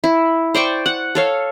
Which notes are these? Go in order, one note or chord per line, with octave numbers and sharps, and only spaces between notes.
E4
C5 D5 G5 C#6
F#5
A4 C#5 F5